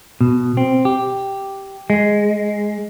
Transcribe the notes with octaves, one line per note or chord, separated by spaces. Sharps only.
B2
C4
G4
G#3